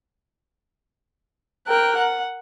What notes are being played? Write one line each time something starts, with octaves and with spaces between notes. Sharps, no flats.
A#4 G5 F#6
F#5